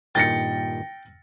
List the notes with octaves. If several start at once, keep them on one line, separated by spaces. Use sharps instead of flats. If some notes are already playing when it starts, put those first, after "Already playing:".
G2 A#2 D#3 G5 A6 A#6 C#7